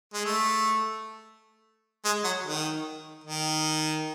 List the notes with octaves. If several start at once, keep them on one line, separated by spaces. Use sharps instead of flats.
G#3
A3
G#3
F#3
D#3
D#3